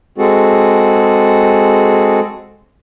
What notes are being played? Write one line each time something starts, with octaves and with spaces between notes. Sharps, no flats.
G#3 C4 F#4 G#4 A4